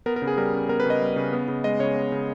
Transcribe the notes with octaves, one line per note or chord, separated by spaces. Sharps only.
B3 A#4
A#4
C#3
G#4
G3 A#4
C#3
B3 A#4
B4
C#3 D#5
G3
C#3
B3
C#3
G#3 D#5
C#3 C#5
B3
C#3